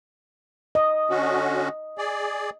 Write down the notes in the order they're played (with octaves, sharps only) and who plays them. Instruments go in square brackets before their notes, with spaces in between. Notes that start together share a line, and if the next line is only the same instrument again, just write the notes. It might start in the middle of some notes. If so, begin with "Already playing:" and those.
[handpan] D#5
[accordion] D3 C#4 F#4
G#4 D5